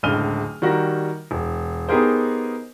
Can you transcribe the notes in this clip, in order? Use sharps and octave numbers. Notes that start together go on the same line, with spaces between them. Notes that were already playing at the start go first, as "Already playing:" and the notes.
D1 C#2 D3 F6 D#7 G7
D#3 G3 F#4 A#4 A#6
E1
B3 D#4 G4 G#4 A#4 C5